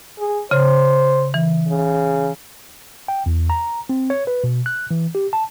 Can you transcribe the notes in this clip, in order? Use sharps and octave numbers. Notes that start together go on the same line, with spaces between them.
G#4
C#3 C5
E3
C#3
G5
E2
A#5
C4
C#5
B4
B2
F#6
E3
G4
A5